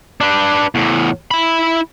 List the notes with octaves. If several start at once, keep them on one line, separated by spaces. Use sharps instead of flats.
D4 B4
E2 A2
E4 B5